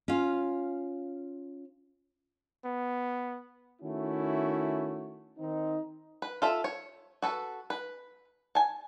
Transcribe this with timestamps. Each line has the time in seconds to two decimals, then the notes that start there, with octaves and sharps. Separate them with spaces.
0.08 C#4 F4
2.65 B3
3.81 D#3 A3 C#4 E4 F#4
5.38 D#3 C4 D#4
6.22 B4
6.42 F4 A4 E5
6.64 C#5
7.22 F#4 A4 B4
7.70 B4
8.55 G#5 A5